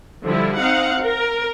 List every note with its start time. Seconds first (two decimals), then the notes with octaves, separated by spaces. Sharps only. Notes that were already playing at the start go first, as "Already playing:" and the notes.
0.24 D3 F3 G3 E4
0.58 C4 D#4 F5 F#5
1.03 A#4